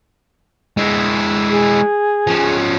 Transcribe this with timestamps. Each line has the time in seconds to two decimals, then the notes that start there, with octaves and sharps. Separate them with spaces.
0.77 G#3 E4
1.48 G#4
2.27 F3 C#4